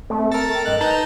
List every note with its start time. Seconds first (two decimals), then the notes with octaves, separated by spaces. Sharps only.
0.10 A3 C4
0.32 A4 A#4 A6
0.54 G5
0.66 G2 D#5 F#6
0.81 D#4 B4 A5 A#5 G6